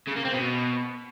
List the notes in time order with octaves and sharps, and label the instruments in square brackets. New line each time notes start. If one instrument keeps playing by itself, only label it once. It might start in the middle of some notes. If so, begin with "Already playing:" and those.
[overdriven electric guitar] C#3
A#3
C4
B2